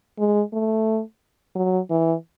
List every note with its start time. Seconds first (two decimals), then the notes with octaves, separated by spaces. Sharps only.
0.18 G#3
0.53 A3
1.55 F#3
1.90 E3